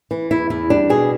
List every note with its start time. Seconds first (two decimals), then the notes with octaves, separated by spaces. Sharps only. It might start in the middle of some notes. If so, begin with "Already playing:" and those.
0.11 E3
0.31 E2 E4
0.50 E2 E4
0.70 G3 D4
0.89 B2 G#4